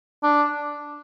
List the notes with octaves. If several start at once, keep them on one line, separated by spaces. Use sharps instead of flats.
D4